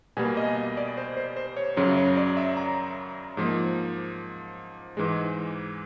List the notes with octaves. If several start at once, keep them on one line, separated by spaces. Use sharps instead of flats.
B2 G3 A#3 G#5
D#5
D#5
D5
C5
C5
C5
C#5
F#2 C#3 F#3 C#5
C#5
D5
E5
A#5
G#2 F3 A#3
G#2 E3 G#3